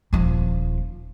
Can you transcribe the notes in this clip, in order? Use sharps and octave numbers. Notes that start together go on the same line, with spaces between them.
D#1 F3